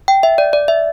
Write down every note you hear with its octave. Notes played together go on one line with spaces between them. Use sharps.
G5
E5
D5
D5
E5